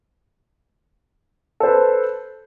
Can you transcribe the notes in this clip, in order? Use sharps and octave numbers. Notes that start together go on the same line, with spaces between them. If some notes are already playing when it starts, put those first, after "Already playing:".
A4 B4 C5